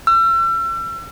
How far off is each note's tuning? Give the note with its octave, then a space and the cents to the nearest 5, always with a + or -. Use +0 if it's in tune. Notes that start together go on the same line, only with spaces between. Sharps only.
E6 +40